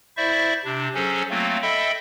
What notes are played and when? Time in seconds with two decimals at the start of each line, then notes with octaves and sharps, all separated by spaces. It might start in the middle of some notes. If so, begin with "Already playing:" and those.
0.17 E4 C5 D5 E5 C#6
0.65 C3 D4
0.95 F#3 C#4 G#4 A4 C5
1.30 F#3 A3 A#3 C4 F4
1.62 A4 D#5 E5 G5 B5